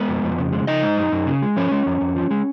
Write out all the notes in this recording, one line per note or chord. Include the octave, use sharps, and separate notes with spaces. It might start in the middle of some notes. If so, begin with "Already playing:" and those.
Already playing: G#3 B3 B4
F2
F2
C#3
G#3
C#3 D#4 D#5
G#3
F#2
F#2
C#3
G#3
F3 C#4 C#5
G#3
F2
F2
F3
G#3